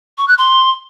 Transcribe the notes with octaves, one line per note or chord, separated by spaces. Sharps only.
C#6
F#6
C6